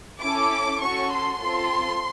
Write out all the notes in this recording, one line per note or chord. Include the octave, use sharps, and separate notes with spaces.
C#4 E4 A4 D6
C#4 F#4 A4 C#6
C6
C4 F4 A4